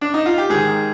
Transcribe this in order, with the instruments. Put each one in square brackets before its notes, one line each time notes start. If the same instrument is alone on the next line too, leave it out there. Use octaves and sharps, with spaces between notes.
[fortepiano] D4
D#4
F4
G4
G#2 D#3 G#4